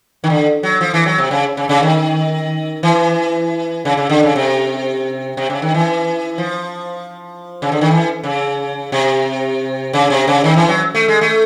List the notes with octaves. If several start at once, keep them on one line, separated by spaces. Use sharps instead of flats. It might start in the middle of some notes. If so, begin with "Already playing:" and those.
D#3
D3
F#3
F3
E3
F#3
C3
C#3
C#3
C#3
D#3
E3
C#3
C#3
D3
C#3
C3
C3
C#3
D#3
E3
F3
C#3
D3
D#3
E3
C#3
C3
C#3
C3
C#3
D#3
E3
F#3
A3
G#3
A3